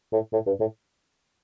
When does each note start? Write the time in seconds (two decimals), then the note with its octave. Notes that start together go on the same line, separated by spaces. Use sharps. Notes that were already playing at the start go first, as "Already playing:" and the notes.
0.13 A2
0.33 A2
0.47 G2
0.60 A2